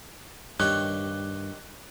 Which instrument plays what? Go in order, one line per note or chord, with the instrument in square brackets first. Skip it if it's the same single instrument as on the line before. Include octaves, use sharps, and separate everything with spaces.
[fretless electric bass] G2 [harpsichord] D#3 G4 C#5 [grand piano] F#6